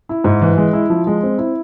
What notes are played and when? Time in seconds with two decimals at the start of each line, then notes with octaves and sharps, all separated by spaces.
0.09 E4
0.24 G#2
0.42 E3
0.57 G#3
0.73 E4
0.90 F3
1.07 G#3
1.23 C4
1.38 E4